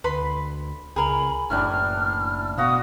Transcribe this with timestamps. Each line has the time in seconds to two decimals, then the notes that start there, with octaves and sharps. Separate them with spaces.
0.04 D2 B4 B5 C6
0.96 C#2 G#4 A#4 G#5 B5
1.50 F#1 A2 E3 D4 F6
2.58 B2 F#4 F5 D#6